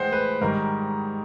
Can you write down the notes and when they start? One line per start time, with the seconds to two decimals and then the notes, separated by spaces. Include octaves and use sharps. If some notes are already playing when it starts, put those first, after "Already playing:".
Already playing: A2 E3 G#3 C5 F#5 G5
0.13 B4
0.41 G#2 D#3 G3 A#4